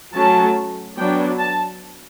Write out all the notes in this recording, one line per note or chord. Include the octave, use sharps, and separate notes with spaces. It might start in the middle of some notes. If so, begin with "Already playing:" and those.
F#3 A3 C#4 A5
F#3 B3 D4 G5
A5